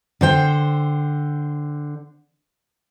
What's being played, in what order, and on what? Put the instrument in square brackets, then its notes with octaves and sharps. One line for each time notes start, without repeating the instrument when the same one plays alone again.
[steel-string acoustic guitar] D3 C5 G5